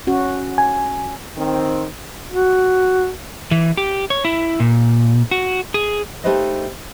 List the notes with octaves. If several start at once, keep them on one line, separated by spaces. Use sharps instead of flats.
C#4 F#4
G#5
D#3 C4
F#4
E3
G4
C#5
E4
A#2
F#4
G#4
A3 D#4 G4 B4 C5 D#5